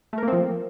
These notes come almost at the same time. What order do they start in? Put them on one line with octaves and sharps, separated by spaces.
A3 A#4 A#3 C4 F3